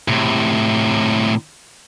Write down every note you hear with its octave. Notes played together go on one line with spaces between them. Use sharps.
A2 C3